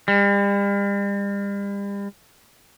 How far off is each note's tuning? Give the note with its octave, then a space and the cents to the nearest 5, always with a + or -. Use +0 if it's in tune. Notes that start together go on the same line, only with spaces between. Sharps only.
G3 +40